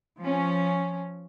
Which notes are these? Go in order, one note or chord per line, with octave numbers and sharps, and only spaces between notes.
F3 C#4